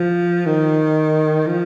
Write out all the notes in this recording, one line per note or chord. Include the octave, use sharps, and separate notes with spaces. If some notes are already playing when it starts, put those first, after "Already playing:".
Already playing: F3
D#3
F3